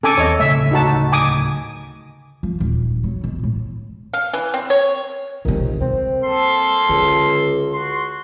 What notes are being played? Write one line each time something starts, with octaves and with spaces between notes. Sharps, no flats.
C#4 D4 A4 G#5 D6
D#2 C4 C#5 D#5
D1 C#3 A3 E5
D#4 F#4 A5
G#5 D6 D#6
F3
D#1
F#3
B2
A2
F5
E3
C4
C#5
C#2 C3 D#3
G3 C4
A#3 A4 C6
C#2 D3
F#4 C6